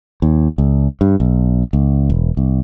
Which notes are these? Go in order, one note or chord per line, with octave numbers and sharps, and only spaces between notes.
D#2
C#2
G2
B1
C#2
E1
C2